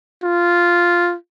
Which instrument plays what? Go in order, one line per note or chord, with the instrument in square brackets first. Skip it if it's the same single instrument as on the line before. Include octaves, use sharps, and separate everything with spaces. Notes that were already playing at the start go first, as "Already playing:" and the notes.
[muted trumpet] F4